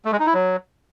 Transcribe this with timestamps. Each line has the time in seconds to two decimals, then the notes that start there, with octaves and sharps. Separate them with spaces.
0.05 A3
0.12 G#3
0.19 D#4
0.27 E4
0.34 F#3